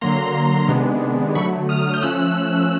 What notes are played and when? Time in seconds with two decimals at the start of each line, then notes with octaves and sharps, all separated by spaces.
0.01 D3 F#3 A#3 A#5 C6
0.68 C3 D#3 G#3 B3 D4
1.35 D3 F#3 A3 B5 C#6
1.69 D#6 F6
1.94 G6
2.02 F3 A3 C#4 E6 F#6